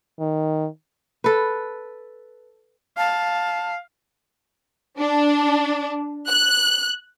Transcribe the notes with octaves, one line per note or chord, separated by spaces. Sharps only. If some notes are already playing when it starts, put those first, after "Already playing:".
D#3
A4 B4
F5 A5
D4
F#6